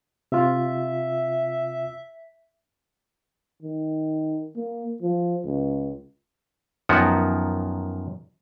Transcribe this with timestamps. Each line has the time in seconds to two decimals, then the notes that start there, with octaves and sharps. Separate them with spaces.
0.32 C3 F4 E5
3.63 D#3
4.56 A#3
5.02 F3
5.45 C#2
6.89 F#2 D#3 F3 B3 F#4